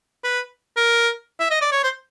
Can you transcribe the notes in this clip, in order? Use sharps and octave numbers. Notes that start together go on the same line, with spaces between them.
B4
A#4
E5
D#5
D5
C#5
C5